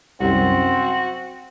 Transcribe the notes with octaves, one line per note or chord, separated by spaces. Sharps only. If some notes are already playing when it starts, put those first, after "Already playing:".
C2 F#2 C4 F#4